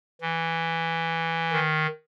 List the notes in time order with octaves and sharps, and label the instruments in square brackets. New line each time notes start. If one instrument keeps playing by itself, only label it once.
[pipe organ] E3
D#3